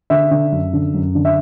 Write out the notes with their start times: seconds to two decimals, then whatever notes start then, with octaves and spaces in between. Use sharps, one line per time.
0.10 D3 E5
0.31 D3
0.52 F#2
0.73 D3
0.94 F#2
1.15 D3
1.25 E5